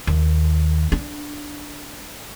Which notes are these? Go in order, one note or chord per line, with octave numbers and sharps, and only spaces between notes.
D#2
D4